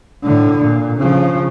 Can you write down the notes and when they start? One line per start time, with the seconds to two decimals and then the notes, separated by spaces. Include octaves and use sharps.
0.24 A2 D3
0.62 A#2
0.99 C#3 F3